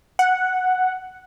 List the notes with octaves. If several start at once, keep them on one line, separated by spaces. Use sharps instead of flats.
F#5